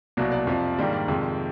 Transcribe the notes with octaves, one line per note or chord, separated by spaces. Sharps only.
C2 B2 F#3 A#3 D5
D5
F2 C3 F3
G#2 D#3 G3 A#3 D4
D5
F2 C3 D#3 G#3